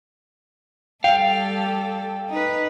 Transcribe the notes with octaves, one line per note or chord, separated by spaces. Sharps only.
G3 A4 F5 G5
D#4 B4